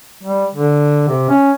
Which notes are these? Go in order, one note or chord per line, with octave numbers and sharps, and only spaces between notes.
G3
D3
C3
C#4